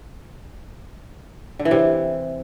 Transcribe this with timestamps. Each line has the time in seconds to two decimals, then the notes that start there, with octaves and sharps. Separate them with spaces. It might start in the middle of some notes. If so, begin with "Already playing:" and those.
1.59 D3
1.65 E3
1.71 C3